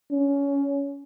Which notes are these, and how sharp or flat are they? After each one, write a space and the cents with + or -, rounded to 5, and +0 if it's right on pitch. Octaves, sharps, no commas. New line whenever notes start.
C#4 +20